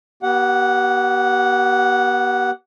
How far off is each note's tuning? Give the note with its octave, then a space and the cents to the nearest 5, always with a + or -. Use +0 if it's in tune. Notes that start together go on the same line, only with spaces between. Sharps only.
B3 -40 G4 -30 F#5 +0